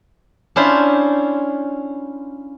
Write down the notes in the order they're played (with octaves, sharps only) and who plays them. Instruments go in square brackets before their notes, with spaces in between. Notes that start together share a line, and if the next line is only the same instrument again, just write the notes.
[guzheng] C#4 D4 E4 F4 C5